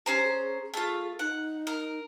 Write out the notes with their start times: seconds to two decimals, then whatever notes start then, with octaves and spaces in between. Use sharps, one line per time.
0.06 C#4 G4 C5 A#5
0.24 G#4
0.74 A3 F4 G#4
1.19 D#4 F#5
1.67 A#4